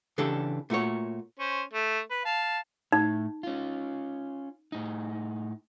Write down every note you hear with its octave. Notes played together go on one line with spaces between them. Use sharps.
C#3 E3 D4 G4 A4
A#2 A3 F#4 C#5
C#4 C5
A3
B4
F5 A5
A2 D#4
C#4 F4
A2 D#4